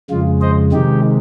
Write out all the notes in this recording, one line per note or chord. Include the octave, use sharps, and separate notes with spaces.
F2 C#3 G#3 F4
C5 D#5
C3 D#3 G#3 D#4 G4